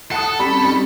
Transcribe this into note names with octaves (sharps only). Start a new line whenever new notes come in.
A4 F#5 A5 D#6
G3 C4 C#4 B5
G3 D#4